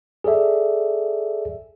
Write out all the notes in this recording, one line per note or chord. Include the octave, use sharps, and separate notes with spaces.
G#4 A4 D5 E5